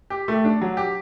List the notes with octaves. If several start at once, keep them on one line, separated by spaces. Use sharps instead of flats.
G4
A3
D4
F#3
G4